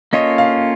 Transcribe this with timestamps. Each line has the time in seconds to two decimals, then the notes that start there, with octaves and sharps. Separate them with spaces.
0.13 A#3 C#4 F4 A4 C#5 D#5
0.38 F5